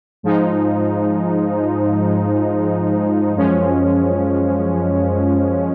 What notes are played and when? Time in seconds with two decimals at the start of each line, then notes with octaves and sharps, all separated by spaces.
0.23 G#2 F3 G#3 D#4
3.36 F#2 F3 G#3 C#4